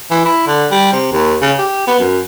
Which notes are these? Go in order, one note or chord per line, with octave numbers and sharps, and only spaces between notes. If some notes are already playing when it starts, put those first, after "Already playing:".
E3
E4
D3
G3
C3
D#2
C#3
G4
B3
F#2